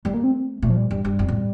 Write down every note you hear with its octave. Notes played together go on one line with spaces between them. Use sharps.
G3 A3
A#3
C4
A#2 A3
F3
G3
G2 G3
G2 G3
F2
A2